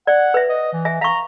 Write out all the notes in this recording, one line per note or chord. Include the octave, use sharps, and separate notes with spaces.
D5 F#5
B4 E5
D#5
E3
E5 G#5
F5 A#5 C#6